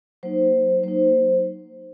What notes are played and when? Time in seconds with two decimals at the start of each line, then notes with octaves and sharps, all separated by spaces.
0.23 F#3 A#3 D#4 C5
0.83 F#3 A#3 D#4 C5